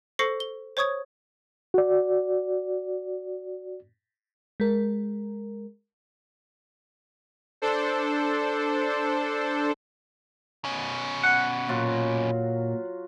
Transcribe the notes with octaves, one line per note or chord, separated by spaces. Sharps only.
A4 C5 C#6 A#6 C7 C#7
G7
C5 C#5 C#6 D#6 G#6
F#4 D5
G#3 A#4
D4 A4 C5
B2 C#4
F#5
A#2 F#3 F4 F#4